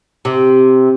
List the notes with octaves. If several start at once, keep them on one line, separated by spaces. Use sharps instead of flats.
C3